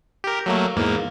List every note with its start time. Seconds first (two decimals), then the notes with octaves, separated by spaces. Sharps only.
0.24 G4 A#4
0.46 F#3 A3 A#3
0.76 E2 G#2 A#3